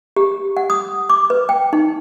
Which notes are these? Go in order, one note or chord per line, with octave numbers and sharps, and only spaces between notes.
G4
F#5
D#6
D6
B4
G5
D#4